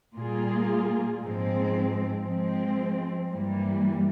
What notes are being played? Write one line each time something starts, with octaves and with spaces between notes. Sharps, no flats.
A#2 G3 A#3 F4 G#4
G#2 F3 G#3 C4
F3 G#3 C4
G2 E3 G3 A#3